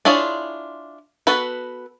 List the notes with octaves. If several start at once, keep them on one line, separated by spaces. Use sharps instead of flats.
D4 E4 F4 G#4 C#5
B3 F#4 A4 B4